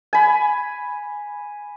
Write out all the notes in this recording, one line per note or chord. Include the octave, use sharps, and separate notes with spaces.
G#5 B5